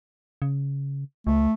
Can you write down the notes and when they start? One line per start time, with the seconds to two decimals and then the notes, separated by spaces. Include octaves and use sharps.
0.42 C#3
1.27 C#2 A3